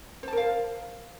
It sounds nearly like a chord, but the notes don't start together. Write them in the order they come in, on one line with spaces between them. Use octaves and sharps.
C5 A5 A#4 F5